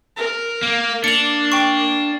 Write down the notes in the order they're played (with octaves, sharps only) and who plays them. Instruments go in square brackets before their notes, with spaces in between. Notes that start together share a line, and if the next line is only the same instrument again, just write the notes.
[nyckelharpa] A#4
[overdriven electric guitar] A#3
[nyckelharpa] A#3 [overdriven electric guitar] D4 [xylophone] C#7 F7
[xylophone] G5 C#6